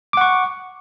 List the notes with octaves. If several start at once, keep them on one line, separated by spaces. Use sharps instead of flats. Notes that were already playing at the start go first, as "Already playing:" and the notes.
F#5 C#6 D6